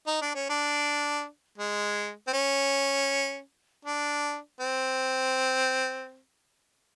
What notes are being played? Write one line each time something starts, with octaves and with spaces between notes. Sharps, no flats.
D#4
D4
C#4
D4
G#3
C4
C#4
D4
C4